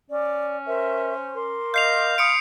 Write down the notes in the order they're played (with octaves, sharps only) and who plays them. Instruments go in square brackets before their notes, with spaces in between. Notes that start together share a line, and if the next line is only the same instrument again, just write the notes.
[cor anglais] C#4 [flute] D5
[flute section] A#4 E5 [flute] C5
[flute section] A#4 C6 D6
[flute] D#5 [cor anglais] F5 [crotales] G6 C7 F7
[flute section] B5 C6 [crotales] D#6 C#7 D7